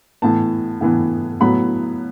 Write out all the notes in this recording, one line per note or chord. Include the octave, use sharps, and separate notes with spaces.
A2 E3 B3 A5
A2 E3 B3
A2 F#3 B3 B5